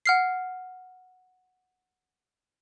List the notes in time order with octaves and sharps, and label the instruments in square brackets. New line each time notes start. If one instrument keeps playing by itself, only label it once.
[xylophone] F#5 F6 C7